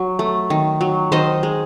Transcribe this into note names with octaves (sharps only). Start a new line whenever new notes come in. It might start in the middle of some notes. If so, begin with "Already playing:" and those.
Already playing: F#3
A3
D#3
F#3
D#3 C5 D#5
G#3